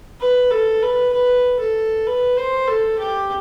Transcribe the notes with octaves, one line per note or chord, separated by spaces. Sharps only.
B4
A4
B4
B4
A4
B4
C5
A4
G4